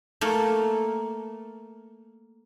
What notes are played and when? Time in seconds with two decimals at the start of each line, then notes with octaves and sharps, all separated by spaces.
0.21 A3 A#3 A4